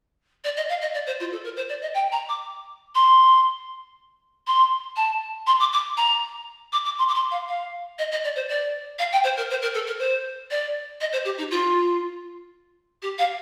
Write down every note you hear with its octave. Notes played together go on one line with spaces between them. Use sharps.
D5
D#5
F5
D#5
D5
C5
F4
A4
A#4
C5
D5
D#5
G5
A#5
D6
C6
C6
A5
C6
D6
D6
A#5
D6
D6
C6
D6
C6
F5
F5
D#5
D#5
D5
C5
D5
F5
G5
C5
A#4
C5
A#4
A4
A#4
C5
D5
D#5
C5
G4
D#4
F4
G4
F5